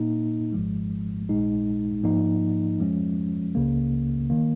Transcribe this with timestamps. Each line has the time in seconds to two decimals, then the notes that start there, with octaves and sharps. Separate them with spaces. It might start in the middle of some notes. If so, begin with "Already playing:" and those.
Already playing: A#2 A#3 D#4
0.52 G#1 G#2 F3 G#3
1.29 A#1 A#2 G#3 D#4
2.03 G#2 F3 A#3 D#4
2.79 F2 F3 G#3 C#4
3.55 C#2 C#3 A#3
4.30 D#3 A#3